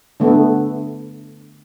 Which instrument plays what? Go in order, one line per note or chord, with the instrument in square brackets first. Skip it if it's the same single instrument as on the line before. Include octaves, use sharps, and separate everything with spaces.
[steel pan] D3 A3 B3